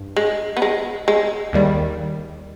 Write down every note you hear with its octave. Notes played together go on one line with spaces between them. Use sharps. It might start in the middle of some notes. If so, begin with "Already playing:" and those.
Already playing: G2
G#3
B3
G#3
G#3
D#2 D#3 G3